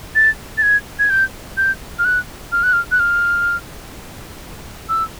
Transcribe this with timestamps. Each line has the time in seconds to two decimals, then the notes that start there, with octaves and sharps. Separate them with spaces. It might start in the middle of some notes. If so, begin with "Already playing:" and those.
0.15 A6
0.58 A6
0.63 G#6
0.99 G#6
1.10 G6
1.57 G6
1.99 F6
2.05 F#6
2.52 F6
2.63 F#6
2.73 F6
2.92 F#6
3.00 F6
4.89 E6